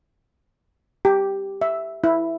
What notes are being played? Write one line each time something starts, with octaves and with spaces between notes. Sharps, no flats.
G4
E5
E4